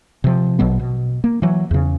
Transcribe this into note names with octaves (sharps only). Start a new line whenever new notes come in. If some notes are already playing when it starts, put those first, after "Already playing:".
C3 F3
A#1 B2 F#3 B3
B2
A#3
E3 F#3
E2 C#3